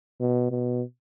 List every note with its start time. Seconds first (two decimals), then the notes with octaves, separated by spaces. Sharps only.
0.21 B2
0.51 B2